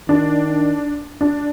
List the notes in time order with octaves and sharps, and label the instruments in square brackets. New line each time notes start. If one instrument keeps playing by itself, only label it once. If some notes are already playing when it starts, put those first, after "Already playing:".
[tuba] D#3 [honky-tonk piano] D4
[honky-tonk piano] D4